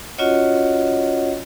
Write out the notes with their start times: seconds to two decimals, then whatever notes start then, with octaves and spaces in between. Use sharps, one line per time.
0.18 C#4 F4 F#4 C#5 D#5 F#5